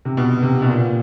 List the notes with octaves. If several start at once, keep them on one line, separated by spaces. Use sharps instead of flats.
C3
B2
C3
B2
A#2